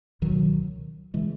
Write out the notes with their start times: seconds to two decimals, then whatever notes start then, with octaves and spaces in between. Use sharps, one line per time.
0.22 C#2 B2 D#3 F#3
1.14 C#3 E3 G#3